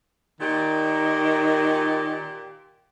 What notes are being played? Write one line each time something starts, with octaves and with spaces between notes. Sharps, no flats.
A#2 D#3 G4